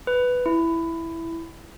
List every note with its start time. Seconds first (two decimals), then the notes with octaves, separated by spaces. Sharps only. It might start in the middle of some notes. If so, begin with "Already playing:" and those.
0.07 B4
0.46 E4